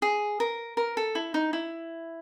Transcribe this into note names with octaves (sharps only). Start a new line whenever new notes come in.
G#4
A#4
A#4
A4
E4
D#4
E4